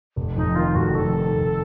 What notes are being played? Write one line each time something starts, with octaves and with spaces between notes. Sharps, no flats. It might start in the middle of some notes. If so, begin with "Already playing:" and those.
F1
F2 D#4
D#3 F4
F1 F#4
F2 A4
D#3
F1